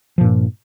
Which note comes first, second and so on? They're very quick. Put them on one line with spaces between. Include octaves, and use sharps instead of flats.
F3 A#2 G2